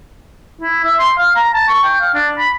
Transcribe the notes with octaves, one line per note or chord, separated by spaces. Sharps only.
E4
E5
C6
F5
A#5
A5
C#6
G5
F5
D4
B5